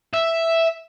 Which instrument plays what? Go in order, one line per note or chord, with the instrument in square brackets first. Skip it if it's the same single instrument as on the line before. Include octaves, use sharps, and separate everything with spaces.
[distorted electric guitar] E5